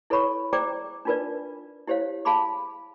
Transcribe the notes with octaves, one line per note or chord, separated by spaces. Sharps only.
E4 A4 B4 C#5 B5 C#6
G#4 C5 D5 G5 A#5 D6
D4 D#4 F4 A#4 B4 D5
E4 G4 C5 C#5 F5
G#4 F5 A5 B5 C6 D6